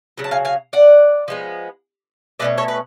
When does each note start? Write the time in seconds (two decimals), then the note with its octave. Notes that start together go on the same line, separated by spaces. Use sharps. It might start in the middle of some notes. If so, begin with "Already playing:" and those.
0.18 C#3 F#3
0.24 A5
0.31 F5 G#5
0.45 F5 G#5
0.73 D5 F#5
1.28 F3 G#3 B3
2.40 B2 A3 C#4 B4 D5
2.58 A4 C#5
2.68 B4